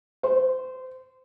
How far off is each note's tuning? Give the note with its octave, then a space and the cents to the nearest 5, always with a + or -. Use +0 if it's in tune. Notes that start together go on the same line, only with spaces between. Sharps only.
C5 -25